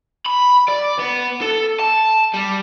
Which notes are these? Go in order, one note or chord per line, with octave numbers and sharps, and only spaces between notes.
B5
D5
B3
A4
A5
G3